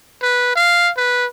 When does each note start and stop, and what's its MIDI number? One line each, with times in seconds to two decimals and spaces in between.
0.22 0.51 71
0.56 0.91 77
0.97 1.26 71